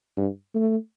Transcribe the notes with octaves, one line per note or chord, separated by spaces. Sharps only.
G2
A3